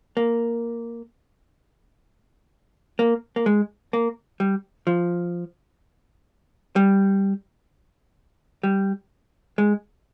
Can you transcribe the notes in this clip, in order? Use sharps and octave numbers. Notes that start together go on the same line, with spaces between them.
A#3
A#3
A#3
G#3
A#3
G3
F3
G3
G3
G#3